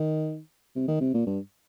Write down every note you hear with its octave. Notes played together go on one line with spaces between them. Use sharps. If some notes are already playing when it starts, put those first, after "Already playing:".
Already playing: D#3
C3
D#3
C3
A#2
G2